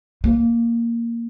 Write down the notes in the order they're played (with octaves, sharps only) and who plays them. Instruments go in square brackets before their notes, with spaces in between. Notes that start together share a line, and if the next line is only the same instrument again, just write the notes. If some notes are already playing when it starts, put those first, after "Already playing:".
[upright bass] A#3